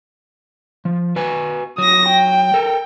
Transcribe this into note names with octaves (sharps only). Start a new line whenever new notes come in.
F3
F#4 B4 G#5
F#3 D#6 A#6
G5
A4 A#4